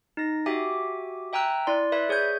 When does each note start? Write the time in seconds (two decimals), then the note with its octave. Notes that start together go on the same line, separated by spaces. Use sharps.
0.17 D#4 A#6
0.46 F#4 G4 E5 G#5 D6
1.33 E5 G5 G#5 A#5 E6 F#6
1.67 E4 D5 C6
1.92 B4 D5 E5 B5 F#6 G#6
2.09 G#4 C#5 G#5 G6 G#6